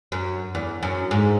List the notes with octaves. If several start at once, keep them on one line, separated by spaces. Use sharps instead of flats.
F#2
E2
F#2
G#2